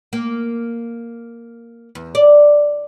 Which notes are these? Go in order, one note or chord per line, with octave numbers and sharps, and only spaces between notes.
A#3
E2
D5